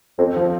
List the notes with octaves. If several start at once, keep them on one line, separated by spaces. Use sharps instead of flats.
F2 C4
F3